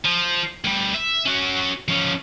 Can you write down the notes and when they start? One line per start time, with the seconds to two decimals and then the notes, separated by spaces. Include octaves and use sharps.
0.05 F3
0.65 D2 G3
0.94 E5
1.25 C#4 F#4
1.88 F3 C#4